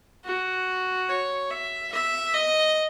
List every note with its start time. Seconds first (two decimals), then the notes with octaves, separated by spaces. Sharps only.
0.24 F#4
1.09 C#5
1.50 E5
1.92 E5
2.33 D#5